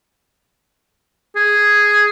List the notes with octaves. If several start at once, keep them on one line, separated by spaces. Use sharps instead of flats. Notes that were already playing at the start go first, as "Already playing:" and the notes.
G#4